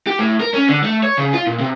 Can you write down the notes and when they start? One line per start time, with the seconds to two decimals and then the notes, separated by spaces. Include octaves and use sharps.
0.07 G4
0.19 A2
0.40 A#4
0.54 C#4
0.69 D3
0.84 A3
1.03 C#5
1.18 C#3
1.34 F4
1.47 A#2
1.60 C3